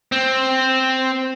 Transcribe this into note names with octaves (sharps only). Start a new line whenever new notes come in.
C4